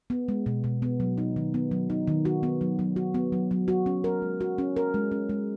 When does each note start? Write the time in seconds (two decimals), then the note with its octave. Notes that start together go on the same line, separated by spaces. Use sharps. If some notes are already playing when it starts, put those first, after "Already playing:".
0.10 B3
0.28 G#3
0.46 B2
0.64 B2
0.82 B3
1.00 F#3
1.18 D#4
1.36 D#3
1.54 B3
1.71 F#3
1.90 D#4
2.07 D#3
2.25 F#4
2.43 B3
2.61 F#3
2.79 F#3
2.96 F#4
3.14 B3
3.32 F#3
3.51 F#3
3.68 F#4
3.86 C#4
4.04 A#4
4.22 G#3
4.41 F#4
4.58 C#4
4.76 A#4
4.94 G#3
5.11 C#4
5.29 G#3